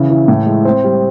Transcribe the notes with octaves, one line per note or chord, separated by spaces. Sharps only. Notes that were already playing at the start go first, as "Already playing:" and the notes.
Already playing: C#3 E3
E3
A2
G#3
C4
G3